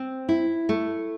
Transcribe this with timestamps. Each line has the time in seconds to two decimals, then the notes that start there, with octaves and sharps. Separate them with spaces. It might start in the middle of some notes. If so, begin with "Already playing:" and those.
Already playing: C4
0.29 E4
0.69 A3